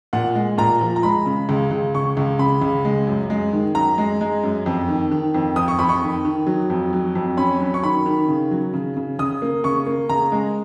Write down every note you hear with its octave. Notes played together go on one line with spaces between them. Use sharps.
A#2 F#5
G#3
A#2 A#5
F3
A#5
G#3 B5
C#3
C#2
C#2
C#3 C#6
C#2
C#3 B5
C#2
G#3
F#2
G#3
D#3
F#2 A#5
G#3
G#3
F#2
F2
D#3
D#3
F2
F2 D#6
C#6
F2 B5
C#6
D#3
D#3
F#3
F2
F#3
F2
C#4 B5
F#3
C#6
D#3 B5
D#3
C#3
F#3
C#3
C#3
C#3 D#6
A#3
C#3 C#6
A#3
C#3 A#5
G#3